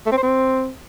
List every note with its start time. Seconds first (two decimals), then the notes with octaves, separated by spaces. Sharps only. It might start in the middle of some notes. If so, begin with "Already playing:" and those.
0.06 A3
0.12 C4
0.17 C5
0.23 C4